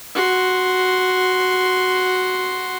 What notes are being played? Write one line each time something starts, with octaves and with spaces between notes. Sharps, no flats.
F#4 C6